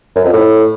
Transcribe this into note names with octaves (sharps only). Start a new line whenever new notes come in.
F#2
F2
A2